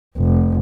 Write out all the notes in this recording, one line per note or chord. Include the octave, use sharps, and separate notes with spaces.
F1